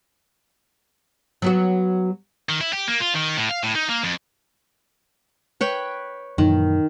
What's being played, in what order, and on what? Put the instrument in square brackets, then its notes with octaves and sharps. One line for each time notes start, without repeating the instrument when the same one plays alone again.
[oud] F#3 B3 F#4
[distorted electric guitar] D#3
E4
G4
A#3
F4
D#3
A2
F5
A2
D#4
A#3
F2
[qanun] B4 C#5 G5
[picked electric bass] F#2 A#2 E3 [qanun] D#3